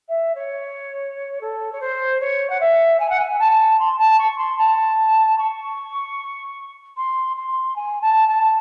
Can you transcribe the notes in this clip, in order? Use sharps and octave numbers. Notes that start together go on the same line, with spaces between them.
E5
C#5
A4
C#5
C5
C#5
F#5
E5
G#5
F#5
G#5
A5
C6
A5
C#6
C6
A5
C#6
C6
C6
G#5
A5
A5